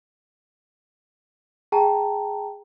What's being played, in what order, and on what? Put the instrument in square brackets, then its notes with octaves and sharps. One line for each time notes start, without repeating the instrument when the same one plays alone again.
[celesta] G#4 G5 A5 A#5